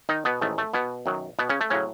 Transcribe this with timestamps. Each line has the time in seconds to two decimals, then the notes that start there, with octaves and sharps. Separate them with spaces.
0.09 D#3 D#4
0.25 B2 B3
0.41 A1 G#2 D#3 A3
0.58 A3
0.74 B2 B3
1.06 F#2 D#3 F#3
1.39 B2 B3
1.49 C#3 C#4
1.61 A3
1.70 A2 C#3 F#3 C#4